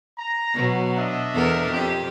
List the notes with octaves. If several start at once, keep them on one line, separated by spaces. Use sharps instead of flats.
A#5
B2 F#3
D4 D#5 E5
E2 A4 A#4
F2 G4